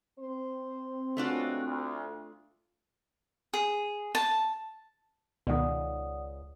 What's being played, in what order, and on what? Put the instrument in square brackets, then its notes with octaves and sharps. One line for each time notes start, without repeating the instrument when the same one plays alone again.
[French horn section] C4 [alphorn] C5
[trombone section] C#2 F#4 [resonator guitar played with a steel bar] A3 D4 F4
[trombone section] D2
[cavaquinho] G#4
A5
[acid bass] C#2 [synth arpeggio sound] B2 D#3 [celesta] D5 F#5 D#6